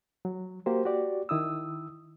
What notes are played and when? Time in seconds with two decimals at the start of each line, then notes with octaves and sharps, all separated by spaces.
0.25 F#3
0.66 A#3 F#4 G4 C5
0.85 F#4 G4 D5
1.29 D#3 E4 D#6 E6